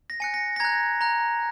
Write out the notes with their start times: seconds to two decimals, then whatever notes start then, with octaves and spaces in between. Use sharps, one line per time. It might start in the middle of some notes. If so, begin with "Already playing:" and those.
0.10 A#6
0.20 G#5 F#6 C#7
0.34 A#6
0.56 A#6
0.60 A#5 F#6 G#6
1.01 A#5 F#6